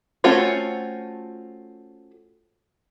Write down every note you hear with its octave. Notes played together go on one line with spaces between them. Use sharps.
A3 C4 C#4 F4 F#4